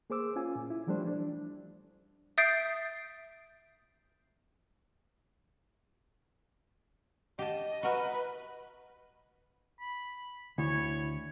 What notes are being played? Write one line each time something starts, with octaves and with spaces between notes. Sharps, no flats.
A#3 G#4 C5 D6 E6
C#4 F4 G#5
A#2
E4
E3 F3 G3 A3 D4 C5
D4
E5 D#6 G6 A6 C7 D7
G4 D#5 A5
F#4 A#4 B4 E5
B5
D2 E4 C#5